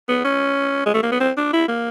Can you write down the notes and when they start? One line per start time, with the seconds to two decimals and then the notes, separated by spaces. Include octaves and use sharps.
0.09 B3
0.24 C#4
0.86 G#3
0.94 A3
1.03 A#3
1.12 B3
1.20 C4
1.37 D4
1.53 E4
1.68 A#3